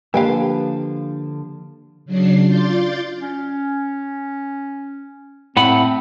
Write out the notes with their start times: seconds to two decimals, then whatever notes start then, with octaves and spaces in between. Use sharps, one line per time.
0.14 D3 F3 A#3 G4 B4 F5 G5 G#5
2.05 C#3 F#3 D4 C7
2.45 F4 D5 C6 G6 A6
3.20 C#4
5.57 A2 C4 F#5 B5